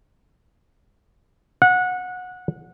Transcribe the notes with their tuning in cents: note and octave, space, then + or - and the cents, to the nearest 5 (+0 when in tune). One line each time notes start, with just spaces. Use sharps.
F#5 -20